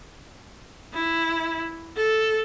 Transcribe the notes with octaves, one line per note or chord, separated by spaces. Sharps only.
E4
A4